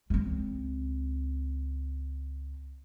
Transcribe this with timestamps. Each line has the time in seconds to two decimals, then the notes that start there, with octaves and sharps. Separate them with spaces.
0.10 C#2 C4